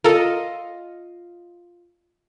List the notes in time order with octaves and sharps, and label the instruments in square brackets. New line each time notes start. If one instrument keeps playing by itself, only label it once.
[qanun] F4 D#5 [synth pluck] A4 A#4